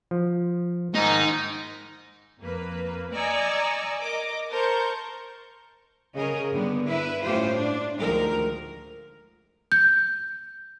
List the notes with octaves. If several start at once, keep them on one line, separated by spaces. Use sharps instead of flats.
F3
G#2 D#3 D#4
F2 A#3 B4
D5 D#5 G#5 A#5 C#6 E6
A#4 D#5 D6 A#6
A#4 C5 A5 C#6 G6
C#3 G#4 A#4 D#5
G2 D3 B3
E4 B4 E5
A2 C#4 F4 G4 C5
D4
D2 D#3 F3 G#3 A#4
G6